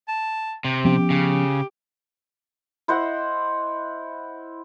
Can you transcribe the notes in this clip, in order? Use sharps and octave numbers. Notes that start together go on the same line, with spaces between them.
A5
C3
F3 B3 C#4 G4
C#3
E4 C5 D#5 F#5